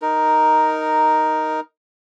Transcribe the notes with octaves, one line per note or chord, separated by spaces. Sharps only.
D#4 A#4